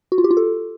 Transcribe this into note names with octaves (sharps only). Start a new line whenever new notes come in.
F#4
F4
G4
F4
A4